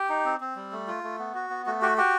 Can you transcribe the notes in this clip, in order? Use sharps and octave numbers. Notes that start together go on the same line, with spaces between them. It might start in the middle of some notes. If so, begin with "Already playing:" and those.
Already playing: G4
D#4
C4
C4
G3
A3
F4
A3
B3
F#4
B3
A3 F#4
F#4 G4
F#4 G4